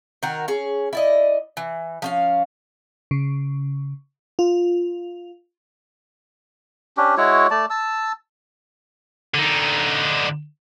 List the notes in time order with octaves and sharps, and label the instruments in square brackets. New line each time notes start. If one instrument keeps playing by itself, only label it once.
[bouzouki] D#3 F#4 A#4
C#4 G#4
E4 D5 D#5
E3
F3 C#4 F5
[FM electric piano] C#3
F4
[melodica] C#4 D4 G4
G#3 E4 F#4 C#5
A3 D5 A5
A5 E6
[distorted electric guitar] D3 D#4